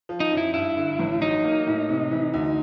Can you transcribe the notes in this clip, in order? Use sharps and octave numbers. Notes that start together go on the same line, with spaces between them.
F3
D#4
F#2
E4
G2 E4
D3
A1
F#3 D#4
A#3
A2
C3
E3
D2